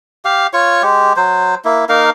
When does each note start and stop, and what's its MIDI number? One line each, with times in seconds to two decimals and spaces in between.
0.25 0.47 67
0.25 0.47 77
0.53 0.82 65
0.53 0.82 73
0.53 0.82 85
0.82 1.13 56
0.82 1.13 67
1.16 1.55 54
1.16 1.55 72
1.65 1.85 58
1.65 1.85 64
1.89 2.10 58
1.89 2.10 63
1.89 2.10 70
1.89 2.10 77